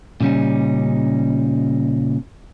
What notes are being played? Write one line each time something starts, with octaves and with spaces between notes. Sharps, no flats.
A#2 C#3 G3 C#4 D#4